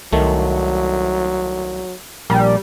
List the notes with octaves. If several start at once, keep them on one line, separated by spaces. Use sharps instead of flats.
C2 D#3 F#3 A3
A#1 G3 A#4